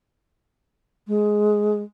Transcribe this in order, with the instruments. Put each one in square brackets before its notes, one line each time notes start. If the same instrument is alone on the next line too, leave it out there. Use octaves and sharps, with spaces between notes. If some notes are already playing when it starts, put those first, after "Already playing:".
[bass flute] G#3